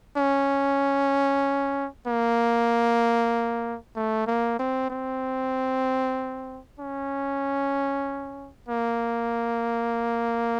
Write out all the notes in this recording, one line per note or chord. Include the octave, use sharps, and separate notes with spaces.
C#4
A#3
A3
A#3
C4
C4
C#4
A#3